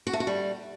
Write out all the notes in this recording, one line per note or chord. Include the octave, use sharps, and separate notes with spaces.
F#4
A3
F#4
G3